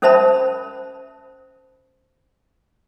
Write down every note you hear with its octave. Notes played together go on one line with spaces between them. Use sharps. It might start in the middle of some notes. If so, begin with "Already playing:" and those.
C#4 A#4 C5 E5 A5 B5